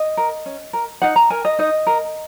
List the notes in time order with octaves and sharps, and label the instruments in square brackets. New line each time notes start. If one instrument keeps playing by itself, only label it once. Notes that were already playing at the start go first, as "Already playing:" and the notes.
Already playing: [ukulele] D#5
A#4
C#4
A#4
D#4 F#5
A#5
A#4 G#5
D#5
D#4 D#5
A#4